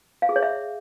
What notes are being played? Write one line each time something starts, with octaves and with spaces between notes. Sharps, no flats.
F5
G#4
C#5
E5